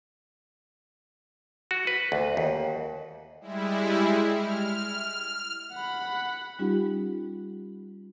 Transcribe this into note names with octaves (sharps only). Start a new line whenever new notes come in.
F#4
B4
D2
D#2
G3 G#3 E4
F6
F#5 B5
G3 C#4 D#4 F4 G4